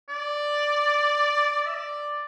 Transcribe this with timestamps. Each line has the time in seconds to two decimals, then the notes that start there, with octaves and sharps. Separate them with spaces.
0.09 D5
1.66 E5
1.74 D5